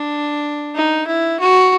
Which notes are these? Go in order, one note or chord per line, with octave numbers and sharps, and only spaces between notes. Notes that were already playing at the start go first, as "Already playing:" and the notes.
Already playing: D4
D#4
E4
F#4